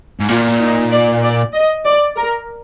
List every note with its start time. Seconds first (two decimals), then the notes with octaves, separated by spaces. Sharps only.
0.20 G#2
0.28 A#2 F4
0.60 D#4
0.91 D5
1.23 D5
1.54 D#5
1.86 D5
2.17 A#4